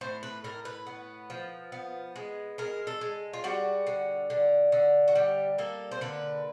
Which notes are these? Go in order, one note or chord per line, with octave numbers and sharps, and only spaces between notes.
A2 C5
B4
A2 A#4
B4
B3
F3
B3
G#3
G#3 A#4
A4
G#3
F4
G3 F#4
D3
D3
D3
F#4
G3 G4
A#3 A4
C5
D3 B4